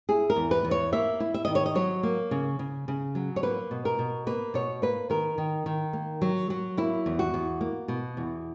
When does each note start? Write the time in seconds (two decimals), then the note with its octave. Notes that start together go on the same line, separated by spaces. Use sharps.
0.09 E4 G#4
0.30 A#4
0.36 E2
0.51 B4
0.65 E2
0.71 C#5
0.92 A#3 E5
1.20 E4
1.34 E5
1.45 D#3 D#5
1.55 C#5
1.66 D#5
1.75 F#3 C#5
2.03 A#3
2.31 C#3
2.59 C#3
2.88 C#3
3.15 F#3
3.36 C#5
3.43 A#3 B4
3.71 B2
3.85 A#4
3.99 B2
4.27 A#3 B4
4.54 B2 C#5
4.82 A#3 B4
5.10 D#3 A#4
5.38 D#3
5.66 D#3
5.93 A#3
6.22 F#3
6.50 F#3
6.77 A#3 E4
7.06 E2
7.19 F#4
7.34 E2
7.61 A#3
7.88 B2
8.17 E2